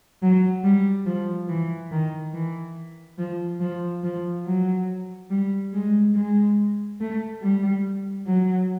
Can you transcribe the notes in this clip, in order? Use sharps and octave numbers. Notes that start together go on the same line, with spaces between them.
F#3
G3
F3
E3
D#3
E3
F3
F3
F3
F#3
G3
G#3
G#3
A3
G3
F#3